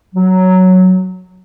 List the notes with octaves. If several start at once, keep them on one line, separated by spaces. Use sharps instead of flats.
F#3